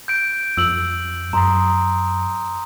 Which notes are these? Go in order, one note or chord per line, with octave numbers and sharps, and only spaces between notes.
G6 D7
F2 E6 F#7
F#2 A#5 C6 D#6